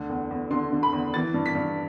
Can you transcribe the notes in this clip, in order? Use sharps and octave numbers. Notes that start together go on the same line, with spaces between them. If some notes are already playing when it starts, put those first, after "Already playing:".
Already playing: D2 D3
E2
E2
D3 C6
D3
B5
E2
E3 A6
G2
B6
G2